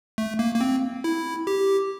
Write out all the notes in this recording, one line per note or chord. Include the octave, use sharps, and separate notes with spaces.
A3
A#3
A#3
C4
E4
G4